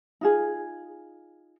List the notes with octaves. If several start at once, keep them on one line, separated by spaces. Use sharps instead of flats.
D#4 F4 G#4